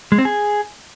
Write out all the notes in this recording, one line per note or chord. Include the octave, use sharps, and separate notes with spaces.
G#3
C4
G#4